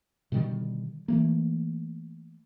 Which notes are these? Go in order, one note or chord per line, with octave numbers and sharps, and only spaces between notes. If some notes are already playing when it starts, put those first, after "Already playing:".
B2 D3 D#3 G3
E3 A3 A#3